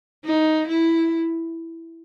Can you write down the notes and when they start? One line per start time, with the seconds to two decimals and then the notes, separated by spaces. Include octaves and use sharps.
0.25 D#4
0.68 E4